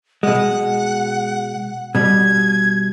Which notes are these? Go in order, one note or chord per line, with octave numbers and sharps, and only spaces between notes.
B2 G#3 F#5
B2 G3 G#6